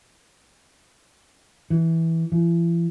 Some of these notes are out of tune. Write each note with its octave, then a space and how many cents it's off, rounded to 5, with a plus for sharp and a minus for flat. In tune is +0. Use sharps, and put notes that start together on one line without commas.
E3 -10
E3 +40